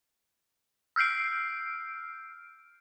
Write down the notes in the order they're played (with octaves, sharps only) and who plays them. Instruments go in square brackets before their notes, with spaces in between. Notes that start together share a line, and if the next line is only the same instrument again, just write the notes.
[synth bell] E6 F6 G6 C7 D7